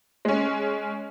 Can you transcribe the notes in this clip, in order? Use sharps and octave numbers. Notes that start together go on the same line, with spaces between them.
G#3 C#4